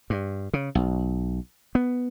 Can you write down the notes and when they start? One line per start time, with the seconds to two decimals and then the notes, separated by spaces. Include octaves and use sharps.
0.10 G2
0.53 C#3
0.75 B1
1.75 B3